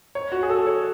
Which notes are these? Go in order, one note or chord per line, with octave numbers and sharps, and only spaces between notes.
C#5
F#4
G#4
A4
C#5